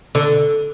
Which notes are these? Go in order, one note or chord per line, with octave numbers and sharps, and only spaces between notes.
D3